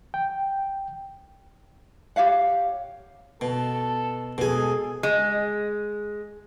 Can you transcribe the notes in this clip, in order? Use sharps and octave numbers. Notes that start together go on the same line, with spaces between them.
G5
G4 C#5 F5 F#5
B2 A4
B2 G#4 A4 G#5
G#3